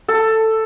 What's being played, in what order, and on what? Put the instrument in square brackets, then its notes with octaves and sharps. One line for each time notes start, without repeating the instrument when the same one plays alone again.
[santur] A4